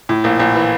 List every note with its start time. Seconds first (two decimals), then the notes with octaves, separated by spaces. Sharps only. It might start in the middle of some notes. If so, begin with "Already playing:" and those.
0.09 A2
0.24 A#1
0.39 A#1
0.55 E3